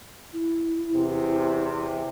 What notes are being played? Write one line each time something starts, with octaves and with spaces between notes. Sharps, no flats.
E4
E2 C3